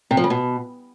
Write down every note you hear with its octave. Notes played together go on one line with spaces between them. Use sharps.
C3
F3
C#3
B2